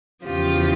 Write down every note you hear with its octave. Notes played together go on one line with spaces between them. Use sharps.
E2 C#3 F3 F4 G4